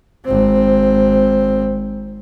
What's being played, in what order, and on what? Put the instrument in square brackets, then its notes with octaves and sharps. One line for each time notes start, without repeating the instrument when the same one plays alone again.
[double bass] G#1 C4